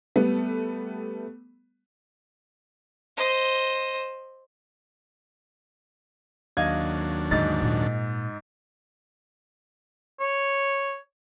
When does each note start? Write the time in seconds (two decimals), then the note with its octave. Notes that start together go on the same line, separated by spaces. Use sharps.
0.16 G3 A3 B3
3.17 C5 D#5
6.57 D#2 F#3 D4 D#5 F5 G#6
7.31 G#2 D3 D#4 A6
7.62 A#2
10.20 C#5